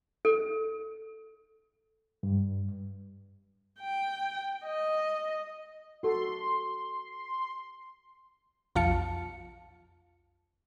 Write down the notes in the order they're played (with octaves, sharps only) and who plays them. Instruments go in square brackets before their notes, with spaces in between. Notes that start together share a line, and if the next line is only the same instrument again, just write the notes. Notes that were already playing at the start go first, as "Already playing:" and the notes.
[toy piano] A4
[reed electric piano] G2
[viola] G5
D#5
[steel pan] F#4 A4 [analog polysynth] C6
[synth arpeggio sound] B1 F2 F4 F5 A5 C#7